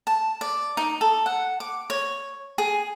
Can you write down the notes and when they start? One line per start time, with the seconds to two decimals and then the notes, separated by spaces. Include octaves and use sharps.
0.07 A5
0.41 D5
0.77 D#4
1.01 A4
1.26 F#5
1.60 D6
1.90 C#5
2.58 G#4